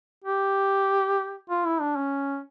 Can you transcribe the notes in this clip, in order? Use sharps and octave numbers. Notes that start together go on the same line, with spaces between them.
G4
F4
E4
D4
C#4